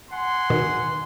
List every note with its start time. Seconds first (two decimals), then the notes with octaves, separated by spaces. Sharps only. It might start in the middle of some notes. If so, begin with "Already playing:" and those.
0.11 F#5 G#5 C6
0.50 B2 D#3